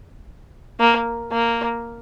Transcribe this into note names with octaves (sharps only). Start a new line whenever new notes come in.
A#3
A#3